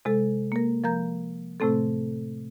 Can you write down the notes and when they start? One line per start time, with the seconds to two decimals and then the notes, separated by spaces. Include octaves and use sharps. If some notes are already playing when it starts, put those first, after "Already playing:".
0.05 C3 G#3 A4
0.52 A#3 A#4
0.84 F3 A#4 A#5 G6
1.60 A2 C3 A3 C4 A4